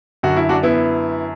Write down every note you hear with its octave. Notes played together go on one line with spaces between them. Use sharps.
F#2 D3 F#4
E4
D4 F#4
B3 E4